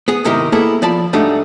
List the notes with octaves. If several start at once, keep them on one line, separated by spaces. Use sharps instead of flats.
B3 G#4
G#2 C3 D#3 D#4 E4 G4
A#3 B3 E4 G#4 A4
F3 D5 A5 B5
G#2 G3 A3 D4 D#4 F#4